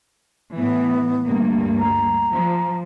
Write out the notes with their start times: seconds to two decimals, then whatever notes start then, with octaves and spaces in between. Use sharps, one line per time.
0.56 A2 E3 B3
1.26 D2 G2 A#3
1.80 A#5
2.31 F3